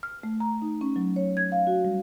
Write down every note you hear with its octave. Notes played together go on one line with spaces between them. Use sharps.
F6
A3
A#5
D#4
C#4
F#3
C#5
G#6
F5
F#4
G3